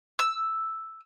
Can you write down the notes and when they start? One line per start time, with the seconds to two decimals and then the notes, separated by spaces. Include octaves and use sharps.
0.19 E6